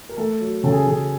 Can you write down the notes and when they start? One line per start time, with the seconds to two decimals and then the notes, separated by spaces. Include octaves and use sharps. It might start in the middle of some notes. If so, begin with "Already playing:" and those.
0.09 A#4
0.17 A3 A4
0.40 F#3
0.63 C#3 A4
0.72 G#4
0.87 C#3 G#4